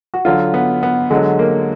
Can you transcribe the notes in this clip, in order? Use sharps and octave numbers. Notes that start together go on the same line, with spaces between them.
F#4
D3 F#3 F4
B3
B3
D3 F#3 G#3
A#3